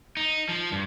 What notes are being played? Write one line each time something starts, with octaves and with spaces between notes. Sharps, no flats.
D#4
F3
G2